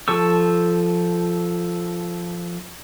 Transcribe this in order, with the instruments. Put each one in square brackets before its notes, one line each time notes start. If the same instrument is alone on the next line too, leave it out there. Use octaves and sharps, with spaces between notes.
[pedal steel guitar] F3 A4 C#6 E6